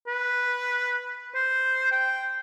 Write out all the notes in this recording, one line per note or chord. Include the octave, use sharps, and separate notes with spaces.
B4
C5
G5